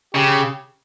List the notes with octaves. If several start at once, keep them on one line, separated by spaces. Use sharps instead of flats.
C#3 G4